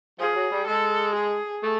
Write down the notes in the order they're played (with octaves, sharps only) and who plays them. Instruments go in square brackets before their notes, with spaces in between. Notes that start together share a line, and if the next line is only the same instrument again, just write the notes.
[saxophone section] F3 [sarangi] G#4
[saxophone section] F#3
G3
[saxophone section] G#3 [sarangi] A4
[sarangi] G#4
[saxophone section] A3